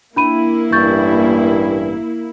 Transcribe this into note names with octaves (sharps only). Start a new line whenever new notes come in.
A#3 D4 E4 B5 D#7
A1 G2 E3 C#6 G6 A6